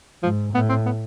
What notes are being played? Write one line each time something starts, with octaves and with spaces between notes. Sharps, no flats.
G#2 F3
A2 B3
C4
B3